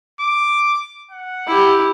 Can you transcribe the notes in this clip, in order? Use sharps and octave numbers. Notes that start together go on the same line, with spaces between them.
D6
F#5
E4 G4